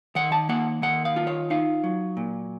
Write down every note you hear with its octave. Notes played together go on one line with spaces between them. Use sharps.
D#3 F#5
A5
A#3 F#5
D#3 F#5
F5
F4
C#5
D#4 F5
F#3
A#2